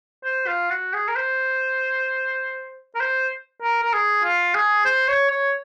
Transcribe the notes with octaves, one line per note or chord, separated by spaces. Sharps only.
C5
F4
F#4
G#4
A#4
C5
A#4
C5
A#4
A#4
G#4
F4
G#4
C5
C#5
C#5